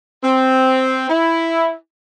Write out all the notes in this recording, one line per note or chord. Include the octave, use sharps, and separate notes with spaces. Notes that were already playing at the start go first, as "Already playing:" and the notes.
C4
E4